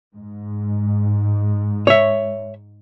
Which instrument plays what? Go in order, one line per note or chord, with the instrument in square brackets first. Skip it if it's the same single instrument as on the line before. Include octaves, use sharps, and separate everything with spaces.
[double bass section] G#2
[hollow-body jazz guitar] C#5 E5